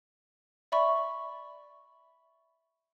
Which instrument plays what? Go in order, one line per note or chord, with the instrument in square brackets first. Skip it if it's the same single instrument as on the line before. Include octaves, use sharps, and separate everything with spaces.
[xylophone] D5 E5 B5 C#6